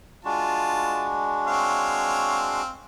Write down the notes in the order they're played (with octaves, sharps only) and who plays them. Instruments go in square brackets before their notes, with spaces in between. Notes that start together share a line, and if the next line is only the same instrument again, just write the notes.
[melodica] G#3 D4 F#4 [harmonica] F4 A5
[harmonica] C4 C#5 F5